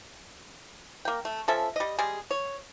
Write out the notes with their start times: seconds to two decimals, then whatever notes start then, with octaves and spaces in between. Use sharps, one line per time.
1.05 A#3 G5
1.25 A3
1.48 F3 C#4 A4 E5
1.76 G3 D#5
1.99 G3 G#3 G#4
2.31 C#5